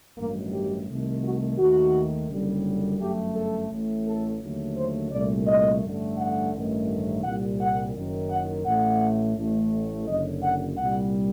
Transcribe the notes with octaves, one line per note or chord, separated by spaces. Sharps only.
A1 G2 D#3 F#3 A#3
G4
C2 C3 D#3 A3
F#4
D#2 D#3 A3 F#4
F#1 F#2 D3 G3
G1 F#2 F#3 A3 G4
A4
A1 A2 A3
A4
D#2 D3 F#3 A3
C5
C2 A#2 A3 D5
D#5
A1 G2 D3 A3
F#5
A1 G2 D#3 A3
C2 A#2 G3 F#5
F#5
F#1 F#2 D#3
F#5
A1 A2 A3 F#5
A1 A2 A3
F#1 F#2 D3 D#5
F#5
C2 A#2 G3 F#5